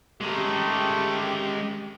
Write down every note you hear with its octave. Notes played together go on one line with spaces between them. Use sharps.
C#3 G#3 A3 G4 A#4